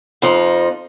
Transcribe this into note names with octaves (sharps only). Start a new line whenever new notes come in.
F2 F3 D#4